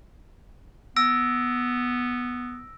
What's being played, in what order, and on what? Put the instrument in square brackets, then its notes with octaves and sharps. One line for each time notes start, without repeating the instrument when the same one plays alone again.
[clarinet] B3 [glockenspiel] E6 A#6 D7